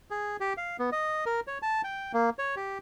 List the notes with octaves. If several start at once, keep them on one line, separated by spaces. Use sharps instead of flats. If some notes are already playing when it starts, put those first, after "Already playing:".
G#4
G4
F5
B3
D#5
A#4
C#5
A5
G5
A#3
C#5
G4